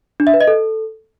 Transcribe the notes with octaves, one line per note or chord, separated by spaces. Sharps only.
D4
E5
B4
D#5
A4